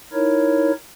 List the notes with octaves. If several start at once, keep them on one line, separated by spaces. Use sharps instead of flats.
D#4 E4 A#4 C#5